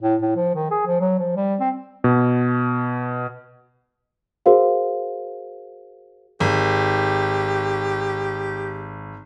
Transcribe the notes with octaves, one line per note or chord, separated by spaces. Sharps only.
A2
A2
F3
D#3
G#4
F3
F#3
F3
G3
C4
B2
F#4 G#4 A#4 C5 F5
G#1 G4